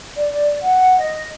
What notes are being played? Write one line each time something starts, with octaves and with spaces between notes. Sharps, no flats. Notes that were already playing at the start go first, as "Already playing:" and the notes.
D5
F#5
D#5